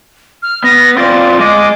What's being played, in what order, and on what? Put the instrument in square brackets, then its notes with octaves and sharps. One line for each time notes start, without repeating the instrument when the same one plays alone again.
[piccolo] F6
[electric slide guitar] B3 [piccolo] A#6
[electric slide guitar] C4 F4 D5 [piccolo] A6
[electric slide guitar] G#3 D#5 [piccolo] D6